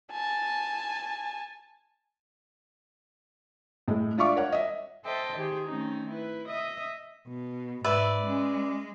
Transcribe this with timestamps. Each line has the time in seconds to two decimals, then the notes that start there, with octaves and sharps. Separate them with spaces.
0.11 G#5 A5
3.88 A2 G#3
4.18 D4 F4 E5 F5 C#6 D6
4.36 A#4 C#5 F#5
4.52 D#5 E5
5.03 A4 C5 D#5 E5 G5 A5
5.36 D#3 G4 G#4 C5
5.66 D#3 A3 C4 C#4 D#4
6.09 E4 B4
6.46 D#5 E5 D#6
7.27 B2
7.84 G#2 B4 D5 E5
8.26 G#3 C#4